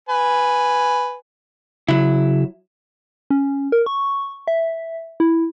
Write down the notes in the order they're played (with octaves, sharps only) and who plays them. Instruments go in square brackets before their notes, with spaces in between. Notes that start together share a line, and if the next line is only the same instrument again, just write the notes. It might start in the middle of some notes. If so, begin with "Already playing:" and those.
[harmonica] B4 G#5
[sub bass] C#3 [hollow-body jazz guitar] F#3 E4
[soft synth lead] C#4
A#4
C#6
E5
E4